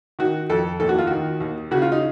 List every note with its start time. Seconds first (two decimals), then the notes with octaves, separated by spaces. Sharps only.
0.19 D#3 F#4
0.50 F2 A4
0.80 D#2 A4
0.89 F#4
0.99 F4
1.07 D#3 F#4
1.40 D#2
1.71 C#3 F#4
1.82 F4
1.92 D#4